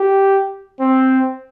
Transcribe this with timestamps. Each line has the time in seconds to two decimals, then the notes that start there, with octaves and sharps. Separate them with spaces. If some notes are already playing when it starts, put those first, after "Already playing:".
Already playing: G4
0.80 C4